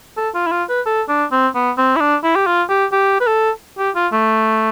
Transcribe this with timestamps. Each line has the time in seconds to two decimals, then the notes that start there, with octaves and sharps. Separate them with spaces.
0.17 A4
0.35 F4
0.47 E4
0.52 F4
0.69 B4
0.86 A4
1.09 D4
1.32 C4
1.55 B3
1.78 C4
1.96 E4
2.00 D4
2.24 E4
2.36 G4
2.47 F4
2.70 G4
2.92 G4
3.21 B4
3.27 A4
3.78 G4
3.96 F4
4.12 A3